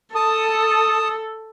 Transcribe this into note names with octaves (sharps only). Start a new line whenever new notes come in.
A4 A5 D#6